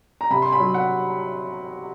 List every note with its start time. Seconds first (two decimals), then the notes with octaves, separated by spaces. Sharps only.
0.21 A#5
0.30 C3 B5
0.42 C6
0.52 B5
0.60 F#3
0.74 F#5